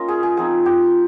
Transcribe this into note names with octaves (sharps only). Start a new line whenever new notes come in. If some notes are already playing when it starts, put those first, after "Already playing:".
Already playing: A#3 C#4 F4 D#5
G#4
G#4
F3 C4 D#4 G#4
G4